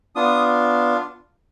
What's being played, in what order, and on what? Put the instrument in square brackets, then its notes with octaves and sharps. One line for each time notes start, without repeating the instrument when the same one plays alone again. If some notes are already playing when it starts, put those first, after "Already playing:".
[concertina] B3 D4 F4 D#6